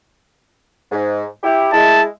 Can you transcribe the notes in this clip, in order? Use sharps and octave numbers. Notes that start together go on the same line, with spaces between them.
G#2
E4 G4
G#3 E4 A5